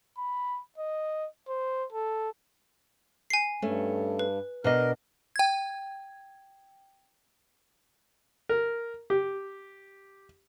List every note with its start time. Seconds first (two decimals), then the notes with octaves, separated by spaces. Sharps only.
0.18 B5
0.78 D#5
1.49 C5
1.93 A4
3.30 G#5 C7
3.62 G2 A3 C#4
4.19 B4
4.64 B2 D4 A#4 D#5
5.36 G5 G#6
8.49 A#4
9.10 G4